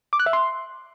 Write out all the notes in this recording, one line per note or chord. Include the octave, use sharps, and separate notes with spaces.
D6
F#6
E5
C6